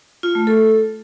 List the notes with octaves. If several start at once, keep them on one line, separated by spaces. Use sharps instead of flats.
F4
A3
A4